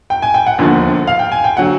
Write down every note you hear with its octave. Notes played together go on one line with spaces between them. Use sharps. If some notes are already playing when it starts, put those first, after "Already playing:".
G5
G#5
G5
F#5
E1 D#2 D3 F3
F5
G5
G#5
G5
D3 F#3 F#5